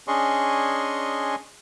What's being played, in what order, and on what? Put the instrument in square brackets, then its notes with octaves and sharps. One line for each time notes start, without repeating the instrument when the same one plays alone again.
[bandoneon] C#4 D4 G#4 D#5 C6 C#6